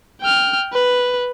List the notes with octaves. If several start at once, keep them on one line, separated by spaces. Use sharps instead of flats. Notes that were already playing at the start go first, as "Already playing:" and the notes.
G5 F6
B4